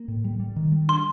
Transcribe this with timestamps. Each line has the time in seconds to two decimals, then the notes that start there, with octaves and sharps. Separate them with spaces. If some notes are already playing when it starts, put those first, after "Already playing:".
Already playing: A#3
0.08 A2
0.24 G3
0.39 G3
0.56 D#3
0.72 G3
0.88 D4 C6